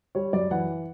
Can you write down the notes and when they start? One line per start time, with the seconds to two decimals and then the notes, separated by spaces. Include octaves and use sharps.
0.15 G3 C#5
0.33 F#2 D5
0.51 E3 F#5